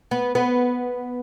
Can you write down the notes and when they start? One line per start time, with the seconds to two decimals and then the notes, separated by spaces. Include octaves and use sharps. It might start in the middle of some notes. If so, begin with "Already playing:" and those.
0.11 B3
0.35 B3